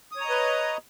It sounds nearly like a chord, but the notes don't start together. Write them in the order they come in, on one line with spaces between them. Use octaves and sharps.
D#6 C#5 A#5 D#5 B4